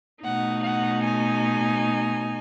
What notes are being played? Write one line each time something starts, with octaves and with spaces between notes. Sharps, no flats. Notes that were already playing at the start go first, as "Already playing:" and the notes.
B2 A3 D#4 F#5
F#5
G#5